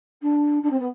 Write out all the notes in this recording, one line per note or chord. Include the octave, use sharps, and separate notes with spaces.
D4
D4
C4
B3